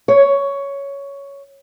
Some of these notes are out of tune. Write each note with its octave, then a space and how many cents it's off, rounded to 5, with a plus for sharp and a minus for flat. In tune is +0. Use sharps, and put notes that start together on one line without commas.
C#5 +10